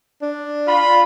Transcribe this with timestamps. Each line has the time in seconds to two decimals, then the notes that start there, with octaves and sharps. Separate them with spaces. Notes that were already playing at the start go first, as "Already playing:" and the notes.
0.22 D4
0.67 F4 B5